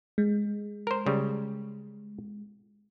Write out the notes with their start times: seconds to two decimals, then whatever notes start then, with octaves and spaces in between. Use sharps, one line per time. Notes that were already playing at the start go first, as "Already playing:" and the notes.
0.18 G#3
0.87 A#4 C5
1.06 C#3 G3